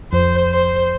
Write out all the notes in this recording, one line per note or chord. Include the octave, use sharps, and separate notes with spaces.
F2 C5
C5